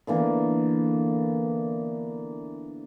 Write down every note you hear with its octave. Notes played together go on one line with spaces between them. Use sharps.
D3 E3 A#3 B3